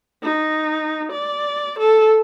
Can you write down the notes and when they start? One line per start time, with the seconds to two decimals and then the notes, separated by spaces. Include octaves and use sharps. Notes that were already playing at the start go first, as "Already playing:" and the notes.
0.23 D#4
1.12 D5
1.79 A4